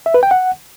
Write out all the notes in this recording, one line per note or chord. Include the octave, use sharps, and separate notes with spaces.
E5
B4
G5
F#5